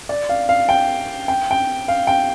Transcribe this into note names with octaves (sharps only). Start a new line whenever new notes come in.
D5
F5
F5
G5
G5
G5
F5
G5